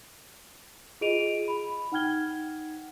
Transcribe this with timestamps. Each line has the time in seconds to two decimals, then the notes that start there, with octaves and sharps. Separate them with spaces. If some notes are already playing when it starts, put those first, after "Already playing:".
1.01 F4 G#4 D#5 D7 D#7 F7
1.48 B5
1.92 D#4 F#5 G5 F6 G#6 G7